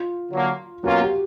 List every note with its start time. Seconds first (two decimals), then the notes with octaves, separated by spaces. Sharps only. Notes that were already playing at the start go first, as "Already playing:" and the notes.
Already playing: F4
0.32 D3 F#3 A#3
0.84 B2 F#3 A#3 C#4 F4 F#4
1.02 G4